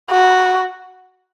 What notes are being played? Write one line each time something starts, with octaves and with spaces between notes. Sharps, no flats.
F#4